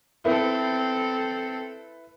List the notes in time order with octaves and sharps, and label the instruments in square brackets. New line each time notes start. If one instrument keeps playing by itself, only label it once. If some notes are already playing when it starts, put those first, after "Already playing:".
[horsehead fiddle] C4 A4 [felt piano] E4 B4